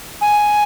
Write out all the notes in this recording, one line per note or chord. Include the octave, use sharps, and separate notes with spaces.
G#5